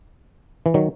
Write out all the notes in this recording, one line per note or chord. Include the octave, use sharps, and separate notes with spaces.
E3
D#3 F#3